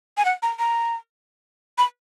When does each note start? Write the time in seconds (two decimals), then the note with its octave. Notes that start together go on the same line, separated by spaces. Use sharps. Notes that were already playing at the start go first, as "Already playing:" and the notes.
0.17 G#5
0.25 F#5
0.42 A#5
0.59 A#5
1.78 B5